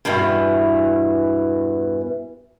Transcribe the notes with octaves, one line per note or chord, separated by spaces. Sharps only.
E2 G2 B2 E3